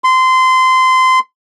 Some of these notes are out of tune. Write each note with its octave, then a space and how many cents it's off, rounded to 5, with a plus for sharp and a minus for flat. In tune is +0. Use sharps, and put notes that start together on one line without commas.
C6 -20